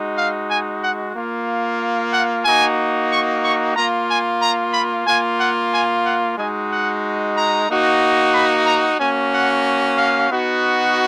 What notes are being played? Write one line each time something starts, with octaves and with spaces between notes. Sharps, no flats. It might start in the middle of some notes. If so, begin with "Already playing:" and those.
Already playing: G#3 D#4 F#4
F5
G#5
F#5
A#3 F4
F#5
A#3 D#4 F#4 G#5
C#6
C#6
A#3 F4 A#5
G#5
A#5
B5
A#3 F4 G#5
F#5
G#5
F#5
G#3 D#4 F#4 G#5
F#5
A#5
A#3 D#4 F#4
B5
A#5
A#3 C#4 F#4 G#5
F#5
F5
B3 D#4 F#4